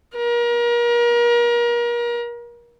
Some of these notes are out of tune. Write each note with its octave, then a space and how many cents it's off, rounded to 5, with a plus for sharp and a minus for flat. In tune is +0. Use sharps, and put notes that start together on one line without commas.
A#4 +35